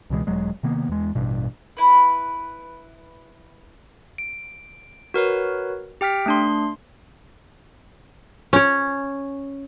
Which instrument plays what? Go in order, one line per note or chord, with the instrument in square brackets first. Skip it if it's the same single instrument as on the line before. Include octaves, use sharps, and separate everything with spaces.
[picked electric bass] C#2 B2 E3 G#3
E1 F#3 G#3
C3 D#3 A#3 B3
E2 G#3
A1 G2 B2
[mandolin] E4 B4
[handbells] D7
F#4 A#4 B4 C#5
G4 G5 F6 B6
A3 D4 C6
[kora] C#4 C#5